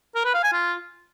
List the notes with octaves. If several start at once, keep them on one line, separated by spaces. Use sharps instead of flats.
A#4
B4
F5
G#5
F4